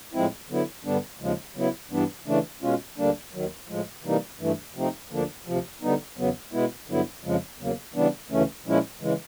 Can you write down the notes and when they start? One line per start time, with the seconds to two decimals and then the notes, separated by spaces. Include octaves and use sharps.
0.13 A2 F3 G#3 C4 E4
0.49 D3 F#3 B3 E4
0.85 G2 D3 G3 B3 D4
1.19 D#2 C#3 F3 G#3
1.55 C#3 F#3 B3 E4
1.91 G2 E3 G3 B3 D4
2.26 C#3 E3 A3 D4
2.62 B2 G#3 C#4 F4
2.98 D2 D3 G3 A#3 D4
3.33 D#2 D#3 F#3
3.68 A2 F3 G#3
4.04 C3 E3 G3 A#3 D#4
4.40 G2 E3 A3
4.75 C3 F3 A3 C4 D#4
5.10 D2 D3 F3 A#3 D4
5.46 D2 C3 F3
5.82 D3 G3 B3 D#4
6.18 E2 C#3 F#3 B3
6.53 B2 G#3 B3 E4
6.88 G2 D3 F#3 B3 E4
7.24 F2 C#3 F3 G#3
7.59 E2 C#3 F#3 A#3
7.94 C#3 E3 G3 B3 D4
8.30 D2 C#3 E3 A3 C#4
8.66 A#2 F3 G#3 C#4 E4
9.01 C#3 E3 G#3